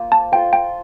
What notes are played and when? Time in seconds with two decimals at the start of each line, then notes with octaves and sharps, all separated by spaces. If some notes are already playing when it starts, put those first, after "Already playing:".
Already playing: A#3 F4 C5
0.12 A5
0.32 F4 A4 C5 G5
0.53 G5